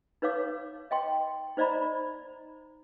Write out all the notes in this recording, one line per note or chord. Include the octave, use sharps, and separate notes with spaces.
D#4 B4 C#5 F5 D6
D#5 G5 C6
D#4 C5 D5 D#5 A#5 B5